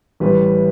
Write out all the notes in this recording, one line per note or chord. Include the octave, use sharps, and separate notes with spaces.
A1 A2 E3 G3 B4